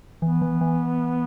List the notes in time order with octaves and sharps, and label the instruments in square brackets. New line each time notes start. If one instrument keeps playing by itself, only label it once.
[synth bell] E3 [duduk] B3
[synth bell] E3
E3